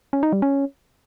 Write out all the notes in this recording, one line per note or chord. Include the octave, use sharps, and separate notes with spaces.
C#4
D#4
G3
C#4